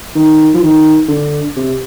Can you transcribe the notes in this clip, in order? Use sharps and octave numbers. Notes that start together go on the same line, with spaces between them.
D#3
F3
D#3
D3
C3